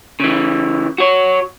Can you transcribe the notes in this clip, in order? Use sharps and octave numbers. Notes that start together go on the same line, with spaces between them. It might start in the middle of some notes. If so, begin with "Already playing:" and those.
C#3 E3
F#4 C#5